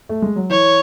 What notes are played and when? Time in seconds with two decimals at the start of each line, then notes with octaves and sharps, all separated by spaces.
0.09 A3
0.22 G#3
0.36 F#3
0.50 E3 C#5